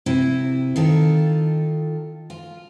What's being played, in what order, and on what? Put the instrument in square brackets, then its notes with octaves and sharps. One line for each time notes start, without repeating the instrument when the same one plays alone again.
[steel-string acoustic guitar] C3 E4
D#3 F4 A4
F4